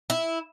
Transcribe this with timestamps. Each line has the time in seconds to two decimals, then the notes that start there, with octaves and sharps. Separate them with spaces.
0.10 E4